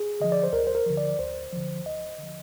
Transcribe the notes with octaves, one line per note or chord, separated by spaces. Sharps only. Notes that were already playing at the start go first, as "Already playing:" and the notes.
Already playing: G#4
D3 F3 D#5
D5
C5
D2 A#4
C5
A#4
D3 F3
D5
D2 C5
D3 F3
D2 D#5
D3 F3